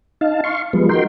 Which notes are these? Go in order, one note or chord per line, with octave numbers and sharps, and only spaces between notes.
D#4 F5 A5
F5 C6 C#6
F3 G3 G#3 B3
D#4 F#4 A#4 G5 C6